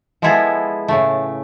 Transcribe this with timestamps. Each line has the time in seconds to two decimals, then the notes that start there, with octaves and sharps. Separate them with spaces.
0.22 F3 G#3 B3 E4 G#4 A4
0.88 A2 C#3 A3